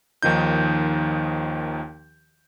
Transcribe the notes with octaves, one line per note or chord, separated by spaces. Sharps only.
D#2 D#3 F3 D#4 G6